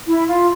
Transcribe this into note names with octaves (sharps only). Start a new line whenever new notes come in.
E4
F4